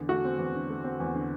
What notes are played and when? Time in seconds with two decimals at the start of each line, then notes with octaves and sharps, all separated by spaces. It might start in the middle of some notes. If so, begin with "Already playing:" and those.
Already playing: E2 D3
0.09 A3 F#4
0.24 C4
0.38 E2
0.55 D3
0.70 A3
0.84 C4
1.00 E2
1.15 D3